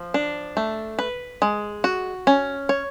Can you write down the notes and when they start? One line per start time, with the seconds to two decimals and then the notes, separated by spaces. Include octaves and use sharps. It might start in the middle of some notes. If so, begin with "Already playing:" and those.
Already playing: F3
0.14 D4
0.57 A3
0.99 B4
1.42 G#3
1.84 F#4
2.27 C#4
2.69 C#5